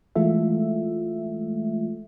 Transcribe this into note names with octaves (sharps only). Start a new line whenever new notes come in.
E3 G#3 A3 F4 A4 E5